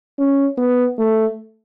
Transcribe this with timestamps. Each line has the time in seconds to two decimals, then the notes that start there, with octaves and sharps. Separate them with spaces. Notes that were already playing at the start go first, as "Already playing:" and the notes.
0.18 C#4
0.57 B3
0.98 A3